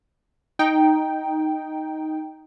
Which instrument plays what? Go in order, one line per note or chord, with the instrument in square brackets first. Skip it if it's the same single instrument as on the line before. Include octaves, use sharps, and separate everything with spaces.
[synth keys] D#4 G5